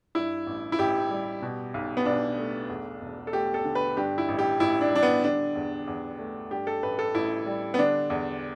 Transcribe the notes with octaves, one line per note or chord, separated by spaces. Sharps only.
G2 E4
A1
E4
A1 G4
G3
B2
B1
B3
B1 D4
A3
E2
E1
A4
A3 G4
A4
D3
B4
G2 G4
E4
A1
G4
A1 E4
D4
G3 D4
B3
D3 D4
E2
E2
A3
G2 G4
A4
A1 B4
A4
A1 E4
G3
B3
D3 D4
E2